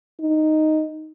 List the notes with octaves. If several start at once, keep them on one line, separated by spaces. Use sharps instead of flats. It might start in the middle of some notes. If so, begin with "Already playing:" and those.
D#4